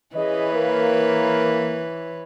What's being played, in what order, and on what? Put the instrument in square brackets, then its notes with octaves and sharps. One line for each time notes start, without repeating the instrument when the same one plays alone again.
[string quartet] E3 B4 C#5 [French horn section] C#4 G#4 D#5
[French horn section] A#3